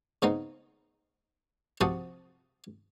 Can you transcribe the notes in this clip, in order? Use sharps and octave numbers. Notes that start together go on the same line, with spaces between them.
C#3 B3 C4 D#4
C3 F3 C4 F#4 A5 D#6